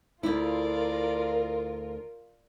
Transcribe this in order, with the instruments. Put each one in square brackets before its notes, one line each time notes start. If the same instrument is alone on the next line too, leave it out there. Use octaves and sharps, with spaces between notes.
[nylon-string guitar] D2 E4 [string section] F4 A#4 [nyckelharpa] D5